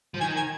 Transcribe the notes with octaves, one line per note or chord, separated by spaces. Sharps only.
F3
D#3 G#5
G#5